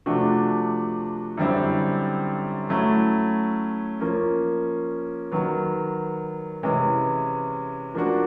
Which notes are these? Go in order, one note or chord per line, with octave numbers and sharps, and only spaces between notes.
C3 F3 A3 D4 F#4
F#2 D3 G3 C4 E4
F#3 A3 C#4 E4
F3 A#3 C#4
D#3 F#3 B3
C3 E3 G#3 C#4
F3 A#3 D4 F#4